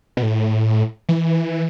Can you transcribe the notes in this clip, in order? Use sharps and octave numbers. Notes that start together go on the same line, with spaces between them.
B2
A2
E3